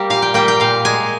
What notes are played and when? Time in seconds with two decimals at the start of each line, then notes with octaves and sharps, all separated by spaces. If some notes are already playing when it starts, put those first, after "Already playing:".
Already playing: G3 A#3 G4
0.10 A#2 F5
0.22 G5
0.34 G3 A#3 G5
0.48 G5
0.60 A#2 F5
0.85 G#3 G#5